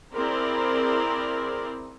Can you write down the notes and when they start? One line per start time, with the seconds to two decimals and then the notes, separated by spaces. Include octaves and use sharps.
0.16 C4 E4 G#4 A#4 C5 D5